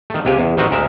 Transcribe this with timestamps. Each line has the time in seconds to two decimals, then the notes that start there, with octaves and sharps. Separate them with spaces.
0.10 D#3 A3
0.25 C#2 C3 G4 G#5
0.38 E2
0.57 A1 D#3 C4 F#4 D#5
0.71 D2 G#3 A#4 E5